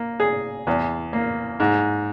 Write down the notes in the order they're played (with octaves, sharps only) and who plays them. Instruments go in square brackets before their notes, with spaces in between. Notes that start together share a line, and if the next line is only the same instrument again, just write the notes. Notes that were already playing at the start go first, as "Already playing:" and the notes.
Already playing: [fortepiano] A#3
G#4
E2
A#3
G#2